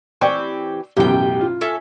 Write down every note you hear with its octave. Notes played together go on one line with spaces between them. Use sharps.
E3 C4 G4 D5 G5 C#6
A1 F#2 B2 G4 G5
F4
C#4 A4 E5